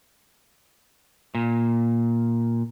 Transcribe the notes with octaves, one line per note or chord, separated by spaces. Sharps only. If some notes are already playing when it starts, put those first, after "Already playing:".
A#2